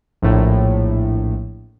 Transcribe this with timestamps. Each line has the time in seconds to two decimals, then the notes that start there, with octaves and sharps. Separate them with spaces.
0.22 A#1 A2